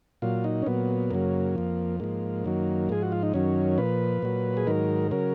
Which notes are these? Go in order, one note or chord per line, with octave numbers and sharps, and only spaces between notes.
A#2 F#3 F4
D#4
C#4
A#2 F#3 B3
F#2 C#3 F#3 A#3
F2 F3
G#2 F3 A#3
F#2 D#3 F#3
G#2 F3 G#4
F#4
F4
D#4
F#2 D#3 F#3 C#4
A#2 F3 B4
A#2 F#3
G#4
G#2 D#3 F#3 A#4
C#3 F#3 A#4